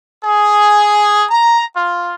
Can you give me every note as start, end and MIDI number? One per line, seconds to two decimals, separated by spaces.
0.25 1.26 68
1.30 1.63 82
1.76 2.13 65